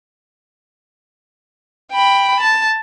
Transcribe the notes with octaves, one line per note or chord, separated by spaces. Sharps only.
G5 B5
A5